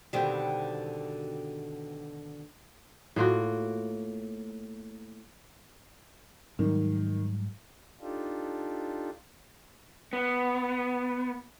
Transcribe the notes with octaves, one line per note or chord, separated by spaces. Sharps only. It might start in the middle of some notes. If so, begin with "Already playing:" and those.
B2 D3 D#3 G3 C4 G4
A2 A#3 F4 F#4
G#2 D#3 F#3 G3
D4 D#4 F4 G4 A4
B3